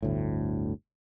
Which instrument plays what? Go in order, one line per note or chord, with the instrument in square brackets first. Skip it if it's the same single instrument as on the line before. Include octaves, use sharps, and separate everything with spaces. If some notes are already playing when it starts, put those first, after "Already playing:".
[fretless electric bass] G1 D2 A2